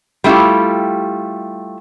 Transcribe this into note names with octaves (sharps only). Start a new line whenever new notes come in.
G3 A3 E4 F4 G4